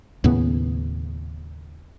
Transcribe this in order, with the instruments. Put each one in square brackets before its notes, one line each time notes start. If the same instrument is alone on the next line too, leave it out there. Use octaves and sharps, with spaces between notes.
[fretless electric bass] D#2 A2 C#3 B3